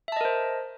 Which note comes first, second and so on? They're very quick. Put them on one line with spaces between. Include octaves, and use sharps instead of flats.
E5 A5 D#5 A#4 C5